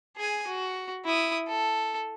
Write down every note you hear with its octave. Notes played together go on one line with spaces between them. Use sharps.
G#4 G#5
F#4
E4 D#6
A4